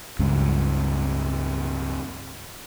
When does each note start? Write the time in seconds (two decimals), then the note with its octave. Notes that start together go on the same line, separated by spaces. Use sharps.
0.19 C#2 G2 G#3 C#4